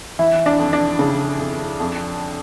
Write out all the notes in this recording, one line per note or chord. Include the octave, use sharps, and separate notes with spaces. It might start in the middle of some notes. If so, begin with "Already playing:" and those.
E3 E4
D4
F2
D4
C#3
F2
F2